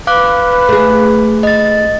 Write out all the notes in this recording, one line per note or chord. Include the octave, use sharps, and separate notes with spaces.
B4 F5 D6 F#6
A3 G#4
D#5 A6